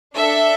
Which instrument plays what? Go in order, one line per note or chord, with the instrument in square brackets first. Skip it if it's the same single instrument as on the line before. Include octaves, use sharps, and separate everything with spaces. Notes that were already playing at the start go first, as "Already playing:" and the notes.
[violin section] D4 A4 E5